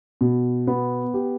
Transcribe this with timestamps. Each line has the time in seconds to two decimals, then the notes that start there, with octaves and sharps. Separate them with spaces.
0.21 B2
0.67 B3
1.14 G4